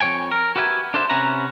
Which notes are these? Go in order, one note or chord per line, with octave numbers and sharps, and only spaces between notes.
F2 G3 C#5 G5 G#5
A#4
F#4 G4 B4 E5 G5 G#5
D4 A4 C5 E5
C3 C#4 B4 F#5 A#5